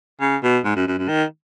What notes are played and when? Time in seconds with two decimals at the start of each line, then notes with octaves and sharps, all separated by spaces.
0.21 C#3
0.43 B2
0.64 G#2
0.76 F#2
0.87 F#2
0.98 F#2
1.08 D#3